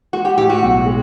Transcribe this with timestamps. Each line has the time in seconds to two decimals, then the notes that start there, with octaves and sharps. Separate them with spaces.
0.13 G#3 F#4
0.25 G4
0.37 A2 G4
0.49 F#4
0.62 B1
0.86 G#3